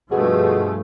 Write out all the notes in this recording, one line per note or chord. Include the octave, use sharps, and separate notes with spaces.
G2 B2 F3 A3 G#4